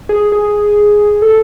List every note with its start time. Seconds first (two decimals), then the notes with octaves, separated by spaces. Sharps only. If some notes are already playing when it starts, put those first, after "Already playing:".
0.09 G#4
0.32 G#4
1.22 A4